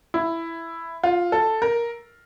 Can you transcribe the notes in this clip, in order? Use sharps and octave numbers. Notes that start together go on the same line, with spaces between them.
E4
F4
A4
A#4